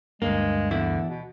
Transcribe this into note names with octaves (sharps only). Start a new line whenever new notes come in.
D2 G2 G#3 A#3
E2 D3 E4
B2